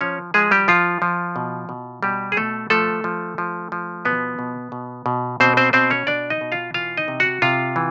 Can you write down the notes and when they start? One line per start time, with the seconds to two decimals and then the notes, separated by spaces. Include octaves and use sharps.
0.01 F3 C#4 C#5
0.34 F3 G#3 G#4
0.51 G3 G4
0.68 F3 F4
1.02 F3
1.36 B2
1.69 B2
2.03 B2 G3 G4
2.32 G#4
2.37 B2 A3 A4
2.70 F3 A3 A4
3.04 F3
3.38 F3
3.72 F3
4.05 B2 B3 B4
4.39 B2
4.72 B2
5.06 B2
5.40 B2 C4 C5
5.57 C4 C5
5.73 B2 C4 C5
5.90 C#4 C#5
6.07 B2 D4 D5
6.30 D#4 D#5
6.41 B2
6.52 F4 F5
6.74 E3 F4 F5
6.97 D#4 D#5
7.08 C3
7.20 F#4 F#5
7.42 C3 F4 F5
7.76 E3